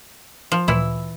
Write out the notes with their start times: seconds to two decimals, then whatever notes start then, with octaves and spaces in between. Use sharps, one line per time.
0.52 F3
0.68 D2 A#2 E3 E4 E6